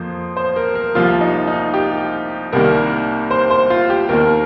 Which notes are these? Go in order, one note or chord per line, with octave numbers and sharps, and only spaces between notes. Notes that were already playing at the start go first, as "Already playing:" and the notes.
Already playing: F2 F3 A#3 C5
C5
A#4
A#4
C2 C3 F3 A#3 F4
D#4
D#4
G4
C2 C3 D#3 G3 A#3 A#4
C5
C5
F4
G4
D#2 D#3 A#3 A#4